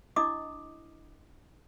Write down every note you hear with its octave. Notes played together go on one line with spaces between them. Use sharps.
D4 E4 D#5 D6 D#6